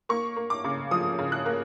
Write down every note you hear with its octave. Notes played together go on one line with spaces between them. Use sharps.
A#3 C#6
A#3
D6
C#3
F3 D#6
C#3
F#6
A#3